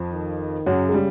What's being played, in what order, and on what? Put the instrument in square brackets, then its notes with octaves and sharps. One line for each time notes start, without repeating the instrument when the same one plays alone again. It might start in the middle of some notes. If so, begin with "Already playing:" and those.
Already playing: [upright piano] F2 F3
[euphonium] D#3
[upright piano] F#2 F#3 [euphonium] C#3
[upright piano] G#3
G3